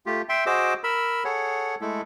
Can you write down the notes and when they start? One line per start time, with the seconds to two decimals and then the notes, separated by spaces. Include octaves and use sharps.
0.06 A3 F4 G4
0.29 E5 G5 C6
0.46 F#4 G#4 C5 D#5 D6 E6
0.84 A#4 B5 E6
1.24 G#4 A4 C#5 F#5
1.81 G#3 A3 E4 A4